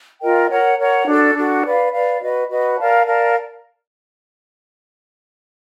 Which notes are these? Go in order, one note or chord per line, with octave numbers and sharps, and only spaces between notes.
F4 A#4 D#5 G5
A#4 C#5 F#5 A#5
A#4 C#5 F#5 A#5
D4 F#4 A4
D4 F#4 A4
B4 D5 F5
B4 D5 F5
F#4 B4 D#5
F#4 B4 D#5
A#4 D5 F5 A5
A#4 D5 F5 A5